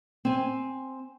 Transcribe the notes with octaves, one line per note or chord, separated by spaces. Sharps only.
C4 G#5